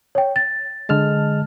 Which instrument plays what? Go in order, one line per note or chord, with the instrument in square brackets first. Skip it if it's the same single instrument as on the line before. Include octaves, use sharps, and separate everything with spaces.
[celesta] C#5 G5
A6
[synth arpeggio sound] D3 A5 [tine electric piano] G#3 F6